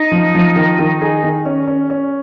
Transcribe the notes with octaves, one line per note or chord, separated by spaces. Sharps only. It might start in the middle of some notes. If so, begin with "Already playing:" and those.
Already playing: D#4
F3
F3
D#3
D#3
G#4
D#3
C#4
C#4
C#4